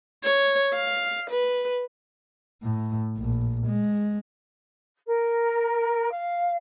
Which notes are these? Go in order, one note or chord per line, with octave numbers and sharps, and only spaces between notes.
C#5
F5
B4
A2
A#1
G#3
A#4
F5